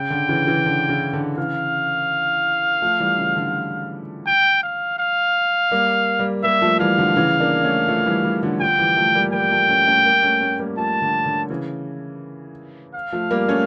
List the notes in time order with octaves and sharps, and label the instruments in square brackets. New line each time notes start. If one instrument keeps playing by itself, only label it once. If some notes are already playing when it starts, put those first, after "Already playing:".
Already playing: [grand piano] C#3 [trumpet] G5
[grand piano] D3
C#3 E3
C#3 E3
D3
C#3
D3
[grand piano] C#3 E3 [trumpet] F5
[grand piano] F3 A3
E3 G3
C#3 E3
D3
[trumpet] G5
F5
F5
[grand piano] G3 A#3
G3 A#3
[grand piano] G3 A#3 [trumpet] E5
[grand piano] F3 A3
[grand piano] E3 G3 [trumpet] F5
[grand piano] D3 F3
C#3 E3
A#3 D4
A3 C#4
F3 A3
E3 G3
E3 G3
D3 F3
[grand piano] D3 F3 [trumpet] G5
[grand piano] E3 G3
F3 A3
G3 A#3
[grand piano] G3 A#3 [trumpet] G5
[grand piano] F3 A3
A3 C#4
A3 C#4
G3 A#3
A3 C#4
A3 C#4
G3 A#3
[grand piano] F3 A3 [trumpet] A5
[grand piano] D3
D3
C#3 E3
[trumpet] F5
[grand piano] F3 A3
G3 A#3
A3 C#4